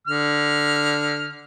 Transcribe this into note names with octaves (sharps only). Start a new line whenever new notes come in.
D3 F6